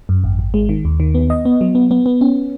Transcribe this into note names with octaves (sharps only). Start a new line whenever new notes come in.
F#2
G#1
G#1
G#3
D#3
D#2
D#3
B3
D#5
B3
F#3
B3
B3
B3
C#4